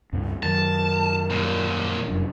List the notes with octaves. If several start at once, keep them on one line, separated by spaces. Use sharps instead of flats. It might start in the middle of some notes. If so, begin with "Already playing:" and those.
C#2 G2 B3
F#2 D#3 F#3 A#4 A5
D#2 A#2
F1 F#2 D4